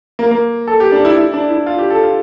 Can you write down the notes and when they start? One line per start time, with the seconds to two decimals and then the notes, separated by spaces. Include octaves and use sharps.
0.19 A#3
0.31 A#3
0.67 A4
0.80 G4
0.92 D4
1.05 E4
1.17 E4
1.34 D4
1.50 E4
1.66 F4
1.78 G4
1.90 A4
2.03 F4